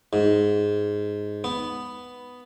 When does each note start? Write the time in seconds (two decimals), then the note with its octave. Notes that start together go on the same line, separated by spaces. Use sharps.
0.13 G#2
1.44 B3